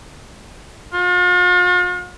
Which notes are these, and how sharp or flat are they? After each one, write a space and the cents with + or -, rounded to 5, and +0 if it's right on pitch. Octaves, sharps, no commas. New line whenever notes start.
F4 +45